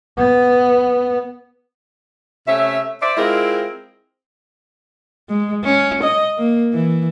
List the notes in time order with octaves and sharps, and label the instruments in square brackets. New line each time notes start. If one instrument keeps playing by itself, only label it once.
[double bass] B3
[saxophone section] C3 A3 C#4 E5
C5 D5 E5
G#3 C4 E4 F4 G#4 A#4
[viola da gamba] G#3
C#4
D#5
A#3
E3